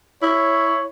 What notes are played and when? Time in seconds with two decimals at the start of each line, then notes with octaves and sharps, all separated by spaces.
0.22 E4 C#5